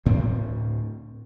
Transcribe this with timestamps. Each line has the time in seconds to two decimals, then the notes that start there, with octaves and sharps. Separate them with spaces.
0.05 D2 A2 C4